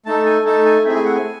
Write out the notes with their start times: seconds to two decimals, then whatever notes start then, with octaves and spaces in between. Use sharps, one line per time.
0.06 A3 D#4 A4 A5
0.26 G#5
0.45 A3 D#4 A4 A5
0.65 G#5
0.85 A3 C4 E4 G#4 E5
0.95 G#5
1.05 F#5
1.15 G#5